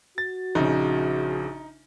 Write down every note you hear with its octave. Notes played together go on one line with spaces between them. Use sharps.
F#4 A6
A#1 C#3 D#4